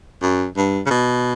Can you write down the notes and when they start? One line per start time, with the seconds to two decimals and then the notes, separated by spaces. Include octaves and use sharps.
0.22 F#2
0.57 G2
0.86 C#3
0.90 B2